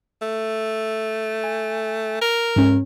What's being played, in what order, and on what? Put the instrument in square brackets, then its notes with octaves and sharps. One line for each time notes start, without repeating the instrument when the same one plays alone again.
[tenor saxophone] A3
[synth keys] G#5
[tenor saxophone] A#4
[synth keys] G#2 C#4